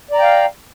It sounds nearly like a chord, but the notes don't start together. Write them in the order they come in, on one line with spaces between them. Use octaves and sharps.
D5 A#5 G5 F5